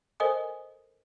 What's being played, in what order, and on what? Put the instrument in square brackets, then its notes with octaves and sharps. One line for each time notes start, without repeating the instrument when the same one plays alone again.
[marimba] A4 A#4 C5 D#5 G#5 D#6